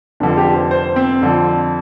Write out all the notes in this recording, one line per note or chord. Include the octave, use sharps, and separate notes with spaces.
F1 F2 D3 F3 D4
G4
C5
C5
C4
F2 D3 F3